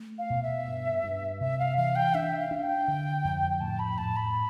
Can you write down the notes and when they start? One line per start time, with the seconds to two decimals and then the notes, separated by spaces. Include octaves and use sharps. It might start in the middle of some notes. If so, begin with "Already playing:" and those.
Already playing: A3
0.18 F5
0.30 B2
0.43 E5
0.68 G2
1.04 G2
1.41 C3 E5
1.59 F5
1.77 E3 F5
1.96 G5
2.15 D4 E5
2.39 F5
2.51 D4
2.63 G5
2.88 D3
3.24 F2
3.51 G5
3.61 A2 A5
3.79 B5
3.98 A2 A5
4.16 B5